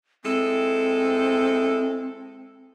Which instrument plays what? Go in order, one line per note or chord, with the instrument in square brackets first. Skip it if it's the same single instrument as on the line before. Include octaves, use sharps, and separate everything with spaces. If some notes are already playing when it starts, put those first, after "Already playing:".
[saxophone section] G#3 E4 A4 [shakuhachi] C4